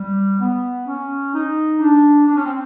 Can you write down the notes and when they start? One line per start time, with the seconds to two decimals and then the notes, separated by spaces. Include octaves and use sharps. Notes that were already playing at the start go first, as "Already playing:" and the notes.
Already playing: G3
0.40 B3
0.87 C#4
1.33 D#4
1.81 D4
2.27 D4
2.35 C#4
2.44 C4